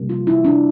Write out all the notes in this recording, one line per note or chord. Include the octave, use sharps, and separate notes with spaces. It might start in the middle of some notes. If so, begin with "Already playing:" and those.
Already playing: C3 G3 A#3
F4
E4
D4